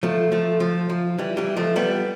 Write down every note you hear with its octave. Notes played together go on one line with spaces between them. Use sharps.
F3 A3
F3 A3
F3
F3
E3 G3
E3 G3
F3 A3
G3 B3